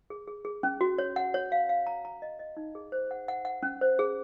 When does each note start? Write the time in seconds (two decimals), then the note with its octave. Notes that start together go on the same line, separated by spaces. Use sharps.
0.10 G#4
0.27 G#4
0.45 G#4
0.63 C#4
0.81 F#4
0.98 C#5
1.16 F#5
1.34 C#5
1.52 F5
1.69 F5
1.87 A#5
2.05 A#5
2.22 D#5
2.39 D#5
2.57 D#4
2.75 G#4
2.92 C5
3.11 F#5
3.28 F#5
3.45 F#5
3.63 C#4
3.81 C5
3.99 G#4